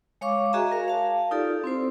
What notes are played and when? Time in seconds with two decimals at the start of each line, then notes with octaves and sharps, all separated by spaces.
0.21 G#3 C#5 F5 C#6 D6
0.53 F#4 G#4 D#5 E5 G#5 A#5
0.72 A#4 F5
0.88 F5 A5
1.31 D#4 F4 G4 A4 D5
1.64 C4 E4 C5